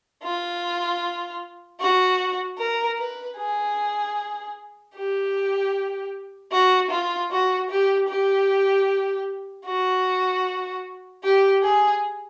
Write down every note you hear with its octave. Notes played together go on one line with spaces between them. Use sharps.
F4
F#4
A#4
B4
G#4
G4
F#4
F4
F#4
G4
G4
F#4
G4
G#4